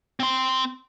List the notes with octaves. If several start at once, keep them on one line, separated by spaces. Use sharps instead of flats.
C4 C6